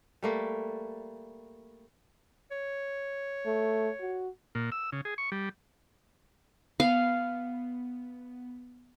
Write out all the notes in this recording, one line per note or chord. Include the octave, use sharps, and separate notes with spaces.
G3 A3 A#3
C#5
A3
F#4
A#2
E6
C#3
G#4
C#6
G3
B3 F5